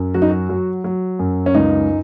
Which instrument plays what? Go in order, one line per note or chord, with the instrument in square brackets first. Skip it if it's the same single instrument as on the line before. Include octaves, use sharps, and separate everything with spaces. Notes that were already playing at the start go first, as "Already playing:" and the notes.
Already playing: [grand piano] F#2
F#3 F#4
D#4
F#4
F#3
F#3
F#2
C#4
C#2 D#4